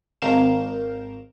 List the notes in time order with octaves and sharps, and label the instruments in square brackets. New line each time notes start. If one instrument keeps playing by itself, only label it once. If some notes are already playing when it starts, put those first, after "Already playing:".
[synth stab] G#1 A#4 F5 G6 E7